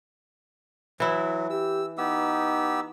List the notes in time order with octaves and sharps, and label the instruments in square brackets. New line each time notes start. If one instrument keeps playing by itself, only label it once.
[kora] E3 E4 [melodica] F#3
[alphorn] G4 [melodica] E6
[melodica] B3 G4 E6 [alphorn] D#4